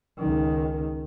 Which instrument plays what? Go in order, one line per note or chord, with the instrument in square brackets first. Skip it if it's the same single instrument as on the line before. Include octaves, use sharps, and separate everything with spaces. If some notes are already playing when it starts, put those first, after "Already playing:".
[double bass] C#2 D#3